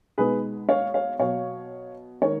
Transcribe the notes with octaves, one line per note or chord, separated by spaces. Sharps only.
B2 G#3 D#4 G#4 B4
C#5 F5
C#5 F5
B2 F#3 B3 C#5 F5
D#3 G#3 D#4 A#4 C#5